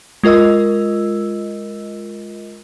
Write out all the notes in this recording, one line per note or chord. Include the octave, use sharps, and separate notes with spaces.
G#3 F4 A#4 D#5 E6